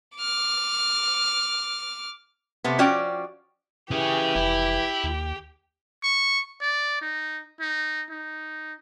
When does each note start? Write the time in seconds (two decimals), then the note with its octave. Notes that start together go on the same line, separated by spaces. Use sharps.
0.18 D6 F6
2.64 C3 A3 B3
2.78 F3 C#4 F#4 D5 G5
3.91 E3 C#4 G4 G#4
4.35 F1 E4
5.04 D#2
6.03 C#6
6.61 D5
7.01 D#4
7.60 D#4
8.11 D#4